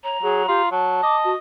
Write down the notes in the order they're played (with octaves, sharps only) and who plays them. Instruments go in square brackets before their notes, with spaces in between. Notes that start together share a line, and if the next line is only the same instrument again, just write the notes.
[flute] C#5 [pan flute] A#5
[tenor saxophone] F#3 [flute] G#4
[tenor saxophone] F4 [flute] G4
[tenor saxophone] F#3 [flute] A5
[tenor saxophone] D#5 [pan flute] D6
[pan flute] F#4